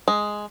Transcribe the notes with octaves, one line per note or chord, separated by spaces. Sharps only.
G#3